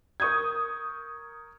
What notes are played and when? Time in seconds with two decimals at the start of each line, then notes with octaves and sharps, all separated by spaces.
0.20 A#4 C#6 D#6 G6 G#6